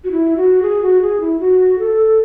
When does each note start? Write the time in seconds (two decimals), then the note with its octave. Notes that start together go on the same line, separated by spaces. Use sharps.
0.04 F#4
0.11 E4
0.37 F#4
0.62 G#4
0.82 F#4
1.01 G#4
1.20 E4
1.40 F#4
1.79 A4